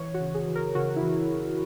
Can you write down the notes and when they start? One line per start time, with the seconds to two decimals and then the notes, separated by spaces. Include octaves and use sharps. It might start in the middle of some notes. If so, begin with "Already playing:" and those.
Already playing: E3 C#5
0.14 F#4
0.21 C#3
0.34 G#4
0.48 E3
0.55 A#4
0.75 C#3 F#4
0.96 E4
1.03 E3